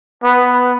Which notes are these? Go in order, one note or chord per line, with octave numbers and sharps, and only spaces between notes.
B3